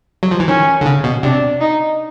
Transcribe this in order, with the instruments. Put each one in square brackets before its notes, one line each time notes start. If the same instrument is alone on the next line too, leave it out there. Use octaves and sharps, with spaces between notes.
[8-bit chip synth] F#3
F3
E3
[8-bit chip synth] D#3 [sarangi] C#4
[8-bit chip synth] D3
C#3
B2
[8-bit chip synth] C3 [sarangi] D4
[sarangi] D#4